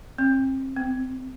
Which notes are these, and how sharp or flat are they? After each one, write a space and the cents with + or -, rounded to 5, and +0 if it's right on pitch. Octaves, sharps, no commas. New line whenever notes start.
C4 +35
C4 -20